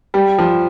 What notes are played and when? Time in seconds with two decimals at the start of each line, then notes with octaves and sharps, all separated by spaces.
0.14 G3
0.38 F3